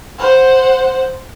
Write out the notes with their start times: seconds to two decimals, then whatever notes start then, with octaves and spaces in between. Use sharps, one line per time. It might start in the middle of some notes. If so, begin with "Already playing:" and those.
0.19 C5 F#5